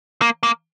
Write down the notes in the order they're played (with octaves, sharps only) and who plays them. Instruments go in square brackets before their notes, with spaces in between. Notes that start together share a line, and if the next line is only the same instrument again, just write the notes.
[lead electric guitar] A#3
A#3